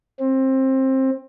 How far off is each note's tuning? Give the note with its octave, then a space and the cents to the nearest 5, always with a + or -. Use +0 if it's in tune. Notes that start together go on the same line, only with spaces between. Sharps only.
C4 +20